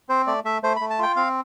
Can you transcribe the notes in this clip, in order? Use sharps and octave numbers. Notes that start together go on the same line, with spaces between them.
C4 C5
A3 D5
A3 E5
A3 C5
B5
A3
A5
F4 G5
C4 F5